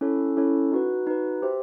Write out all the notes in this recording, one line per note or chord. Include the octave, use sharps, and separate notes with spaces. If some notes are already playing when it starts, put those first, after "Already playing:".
C#4 E4 A4 C#5
C#4 E4 A4 C#5
D#4 F#4 B4
D#4 F#4 B4
G4 C5 E5